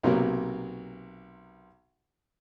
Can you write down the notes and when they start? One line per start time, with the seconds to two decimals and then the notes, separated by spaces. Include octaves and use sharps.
0.03 B1 C3 F#3 A#3 A#4